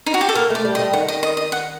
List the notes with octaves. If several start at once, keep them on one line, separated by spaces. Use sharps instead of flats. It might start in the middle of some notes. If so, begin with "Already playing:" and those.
D#4
F#4
G4
A4
A#3 A#4
A3 D5
G3
D#5
G3
D#3 F#5
D#5
D#5
D#5
F#5